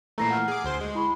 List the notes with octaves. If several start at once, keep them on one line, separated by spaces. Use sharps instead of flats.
A#2 E3 A3 A#5 A#6 C7
F#5 F6
G#4 D6
D2 C5 C6
G#3
E4 B5 C#6